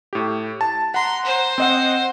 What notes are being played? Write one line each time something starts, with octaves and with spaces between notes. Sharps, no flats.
A2 G4
A5
F#5 A#5 C6
C5
C4 D#5 F#5